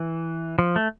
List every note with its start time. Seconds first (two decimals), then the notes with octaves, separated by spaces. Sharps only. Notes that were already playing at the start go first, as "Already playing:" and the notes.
Already playing: E3
0.59 F3
0.76 A3